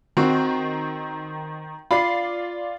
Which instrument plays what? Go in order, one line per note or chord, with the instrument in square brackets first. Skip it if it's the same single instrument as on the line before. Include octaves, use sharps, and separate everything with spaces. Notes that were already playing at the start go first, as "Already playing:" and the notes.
[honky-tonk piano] D#3 [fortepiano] C4 F#4
[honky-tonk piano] F4 D5 C7 [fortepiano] B5